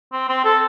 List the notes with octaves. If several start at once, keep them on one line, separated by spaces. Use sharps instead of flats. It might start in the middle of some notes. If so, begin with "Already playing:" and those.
C4
C4
A4